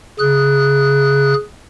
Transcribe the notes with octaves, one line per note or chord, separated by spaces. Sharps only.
C#3 G#4 F#6